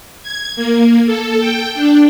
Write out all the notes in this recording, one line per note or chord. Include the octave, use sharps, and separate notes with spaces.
G#6
A#3
A4
G5
D4